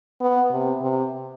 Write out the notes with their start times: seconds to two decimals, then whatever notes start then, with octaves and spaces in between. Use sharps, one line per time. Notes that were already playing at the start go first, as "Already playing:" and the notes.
0.21 B3
0.51 C3
0.81 C3